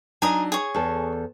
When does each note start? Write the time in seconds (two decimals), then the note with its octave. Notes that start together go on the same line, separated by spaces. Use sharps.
0.22 F#3 D4 D#4 G#5 A#5 D#6
0.52 G#4 C#5
0.74 E2 A4